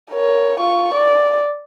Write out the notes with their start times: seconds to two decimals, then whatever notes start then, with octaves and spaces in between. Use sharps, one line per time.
0.11 A#4 C#5
0.60 F4 C#6
0.94 D5